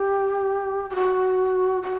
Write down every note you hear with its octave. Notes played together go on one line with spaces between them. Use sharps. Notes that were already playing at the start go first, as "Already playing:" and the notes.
Already playing: G4
G4
F#4
F#4